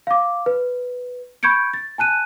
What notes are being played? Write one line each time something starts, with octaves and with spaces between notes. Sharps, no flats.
F5 D6
B4
B5 C#6 G6 G#6 C#7 D7
A6
G#5 A5 F#6 D#7